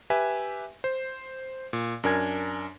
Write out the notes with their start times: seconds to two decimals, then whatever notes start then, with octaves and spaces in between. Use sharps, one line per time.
0.10 G4 B4 E5 G#5
0.84 C5
1.73 A#2
2.04 F#2 D4 A#4 G#5 G#6